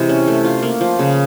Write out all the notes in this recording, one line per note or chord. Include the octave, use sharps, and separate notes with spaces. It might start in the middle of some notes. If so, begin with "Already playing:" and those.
Already playing: C3 E3 G#3
C#4
A3
F4
A#3
F3
C#3